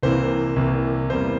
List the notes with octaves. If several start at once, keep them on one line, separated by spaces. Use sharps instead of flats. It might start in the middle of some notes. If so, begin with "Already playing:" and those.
C2 C3 E3 A#3 C5
C2 C3 E3 A#3
E2 C3 G3 A#3 C5